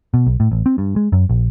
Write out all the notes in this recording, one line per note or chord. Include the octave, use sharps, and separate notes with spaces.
B2
B1
A2
A1
C4
G2
G#3
F#2
A#1